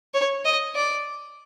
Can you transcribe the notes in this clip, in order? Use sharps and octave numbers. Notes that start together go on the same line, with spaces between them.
C#5
D#5
D5